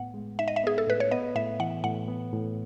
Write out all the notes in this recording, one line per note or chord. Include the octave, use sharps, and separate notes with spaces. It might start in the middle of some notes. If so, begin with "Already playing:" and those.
Already playing: A2 B3 F#5
G#3
D#4 E5
D#5
E5
B3 G#4
A4
A2 B4
C#5
B3 D#5
A2 E5
E3 F#5
A2 F#5
B3
A2